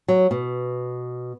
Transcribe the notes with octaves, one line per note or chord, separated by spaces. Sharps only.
F#3
B2